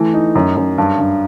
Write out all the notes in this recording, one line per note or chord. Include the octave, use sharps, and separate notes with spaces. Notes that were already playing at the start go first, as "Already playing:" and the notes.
Already playing: E3 A3
D#4
F#2
F#2
G2
G2